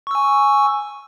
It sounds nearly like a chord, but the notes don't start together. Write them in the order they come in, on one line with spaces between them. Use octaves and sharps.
C#6 E6 G#5